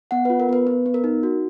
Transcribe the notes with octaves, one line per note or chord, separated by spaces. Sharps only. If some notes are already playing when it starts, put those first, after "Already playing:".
B3 F#5
B4
F4
A#4
B3 B4
B3 B4
B3
A#4
D#4
F#4